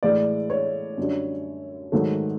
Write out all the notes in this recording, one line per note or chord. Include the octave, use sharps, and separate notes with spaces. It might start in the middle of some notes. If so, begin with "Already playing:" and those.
A2 E3 G#3 D5
C#5
F#2 D3 G3
G#2 D#3 F#3 A3